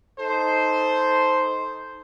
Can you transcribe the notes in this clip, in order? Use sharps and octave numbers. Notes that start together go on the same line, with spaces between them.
D#4 A4 C5